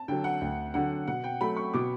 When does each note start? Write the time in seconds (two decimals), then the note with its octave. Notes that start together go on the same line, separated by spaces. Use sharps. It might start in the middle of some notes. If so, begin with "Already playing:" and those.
Already playing: A5
0.08 D3 F#3 G5
0.24 F#5
0.41 D2 G5
0.74 D3 F#3 F#5
1.08 B2 F#5
1.24 G5
1.41 F#3 A3 B5
1.57 C#6
1.74 B2 D6